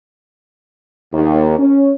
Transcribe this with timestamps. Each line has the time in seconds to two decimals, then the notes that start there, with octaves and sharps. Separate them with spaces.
1.13 D#2
1.58 C#4